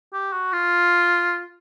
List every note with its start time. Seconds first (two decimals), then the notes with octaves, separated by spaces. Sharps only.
0.13 G4
0.33 F#4
0.53 F4